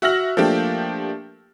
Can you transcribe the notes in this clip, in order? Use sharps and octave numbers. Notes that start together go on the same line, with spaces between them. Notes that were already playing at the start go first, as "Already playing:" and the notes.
F#4 E5 E6 F6 A#6 F#7
F3 A3 A#3 D4 G4